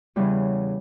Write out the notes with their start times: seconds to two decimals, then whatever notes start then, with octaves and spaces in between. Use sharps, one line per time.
0.16 E2 C#3 E3 G3